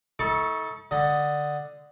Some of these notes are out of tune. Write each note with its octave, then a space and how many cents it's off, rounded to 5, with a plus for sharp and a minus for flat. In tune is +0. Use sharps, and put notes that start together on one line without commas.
D#4 +45 A4 +0 C#6 +0
D3 +10 D#5 +5